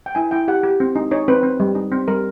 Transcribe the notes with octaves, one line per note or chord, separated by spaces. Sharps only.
G5
E4 G#5
E4 G5
G4 F#5
G4
C4
D#4
D#4 C#5
C4 B4
C4
G3
D#4
C4
G3 A#4